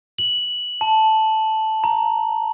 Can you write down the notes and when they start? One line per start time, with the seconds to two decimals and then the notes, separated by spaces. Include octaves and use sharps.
0.18 F#7
0.81 A5
1.84 A#5